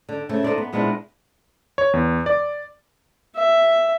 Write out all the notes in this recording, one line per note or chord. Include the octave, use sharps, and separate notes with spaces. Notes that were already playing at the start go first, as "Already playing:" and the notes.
D3
C#3 A3 C4
D#4 F4 A4 C5 D5
B3
A#2 G#3 B3 C4 D4 E4
C#5
E2
D5
E5